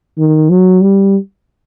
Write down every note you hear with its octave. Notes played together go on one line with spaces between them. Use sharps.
D#3
F#3
G3